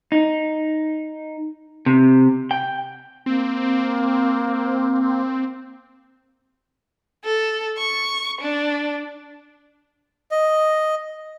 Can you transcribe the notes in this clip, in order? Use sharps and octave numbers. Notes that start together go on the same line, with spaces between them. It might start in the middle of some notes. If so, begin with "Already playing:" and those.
D#4
C3
G5
A#3 C4
A4
C#6
D4
D#5